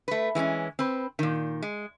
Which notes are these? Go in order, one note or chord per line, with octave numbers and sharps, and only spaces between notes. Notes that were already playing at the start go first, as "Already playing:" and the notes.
A3 B4
E3 G#3 B3 C#4
C4 B4
A#2 D#3
G#3